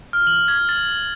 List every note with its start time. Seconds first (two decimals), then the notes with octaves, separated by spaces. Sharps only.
0.13 F6
0.27 F#7
0.48 G#6
0.69 A6